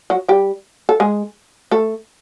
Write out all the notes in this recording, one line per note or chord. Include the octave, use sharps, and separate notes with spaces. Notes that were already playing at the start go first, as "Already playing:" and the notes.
F#3 F#4
G3 G4
A4
G#3 G#4
A3 A4